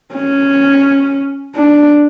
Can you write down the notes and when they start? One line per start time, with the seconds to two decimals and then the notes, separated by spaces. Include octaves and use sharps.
0.14 C#4
1.55 D4